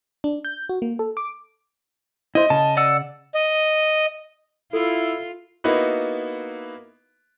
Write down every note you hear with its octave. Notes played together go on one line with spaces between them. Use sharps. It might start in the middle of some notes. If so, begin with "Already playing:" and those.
D4
G6
F#4
A#3
A4
D6
E4 C5 D#5
C#3 A5
D5 F#5 E6
D#5
E4 F4 A4
A#3 B3 D#4 E4 F#4 B4